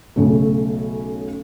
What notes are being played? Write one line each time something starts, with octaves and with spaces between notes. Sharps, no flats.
B1 C#3 A3